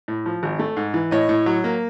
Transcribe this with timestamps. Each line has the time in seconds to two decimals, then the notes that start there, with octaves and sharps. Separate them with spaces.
0.08 A2
0.26 F3
0.43 G#1
0.59 A3
0.77 G#2
0.94 E3
1.11 A2 C#5 D#5
1.29 A2
1.46 F#3
1.64 A#3